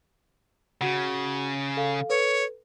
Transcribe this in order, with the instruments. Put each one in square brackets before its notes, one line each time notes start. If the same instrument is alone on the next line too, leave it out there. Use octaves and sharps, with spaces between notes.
[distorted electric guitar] C#3 [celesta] F#4 F#5
[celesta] A4 F5
[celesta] A4 B4 [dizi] C#5